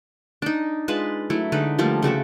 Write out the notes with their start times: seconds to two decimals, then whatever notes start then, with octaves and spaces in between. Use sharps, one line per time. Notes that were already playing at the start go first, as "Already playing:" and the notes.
0.42 D4 D#4
0.88 G#3 F4 B4 A5
1.30 F#3 A3 E4
1.52 D3 G#3 D#4 B4
1.79 F3 G3 A3 A#3
2.03 C#3 A3 F#4 E5